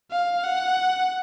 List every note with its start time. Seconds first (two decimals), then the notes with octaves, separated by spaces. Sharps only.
0.11 F5
0.44 F#5